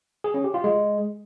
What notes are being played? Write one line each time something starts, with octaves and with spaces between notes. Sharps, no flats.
G#4
C#4
G4
F4
G#3